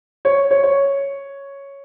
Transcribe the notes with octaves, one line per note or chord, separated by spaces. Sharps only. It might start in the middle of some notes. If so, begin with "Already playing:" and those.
C#5
C#5
C#5